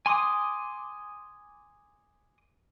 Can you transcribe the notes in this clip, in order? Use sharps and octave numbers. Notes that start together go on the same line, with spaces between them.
G#5 C6 D6 D#6